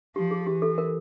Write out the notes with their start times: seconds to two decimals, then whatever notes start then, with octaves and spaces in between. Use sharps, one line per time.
0.16 F3 G4
0.31 G#4
0.46 E3 G4
0.62 A4
0.78 A#4